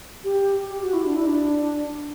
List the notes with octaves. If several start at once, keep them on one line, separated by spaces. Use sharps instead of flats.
G4
G4
F#4
E4
D4
E4
D4